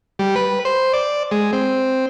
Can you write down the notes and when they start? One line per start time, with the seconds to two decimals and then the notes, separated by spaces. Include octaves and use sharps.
0.19 G3
0.36 B4
0.65 C5
0.93 D5
1.31 G#3
1.53 C4